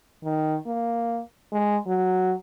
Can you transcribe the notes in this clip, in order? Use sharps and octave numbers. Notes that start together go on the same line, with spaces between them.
D#3
A#3
G#3
F#3